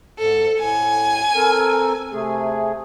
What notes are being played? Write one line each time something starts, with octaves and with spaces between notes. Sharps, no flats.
G#2 A4
A2 G#5
C4 A4 A#4
C3 A3 G#4